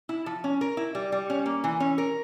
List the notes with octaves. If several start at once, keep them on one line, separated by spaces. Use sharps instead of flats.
E4
F3
C#4
A#4
E4
G3
G3
C#4
A#3
E3
C#4
A#4